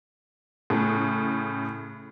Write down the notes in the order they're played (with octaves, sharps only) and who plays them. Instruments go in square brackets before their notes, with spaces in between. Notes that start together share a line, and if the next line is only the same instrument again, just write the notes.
[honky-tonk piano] A2 C#3